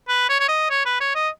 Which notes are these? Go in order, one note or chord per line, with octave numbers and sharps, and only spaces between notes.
B4
C#5
C#5
D#5
C#5
B4
C#5
D#5